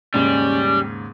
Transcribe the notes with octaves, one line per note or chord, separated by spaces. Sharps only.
D#2 G#2 C#3 G3 C#4